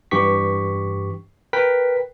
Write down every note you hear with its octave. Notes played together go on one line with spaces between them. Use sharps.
G2 E3 G4 C#6 B6
A#4 B4 G5 B6